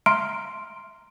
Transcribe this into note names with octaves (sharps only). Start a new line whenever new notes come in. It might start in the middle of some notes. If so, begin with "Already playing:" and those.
E5 A#5 C6 F6 D7